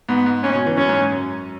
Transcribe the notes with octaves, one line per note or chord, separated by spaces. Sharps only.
G#2 B3
G#2
G#2 C#4
B2
E3
F#2 C#4
G#2
G#2
F#2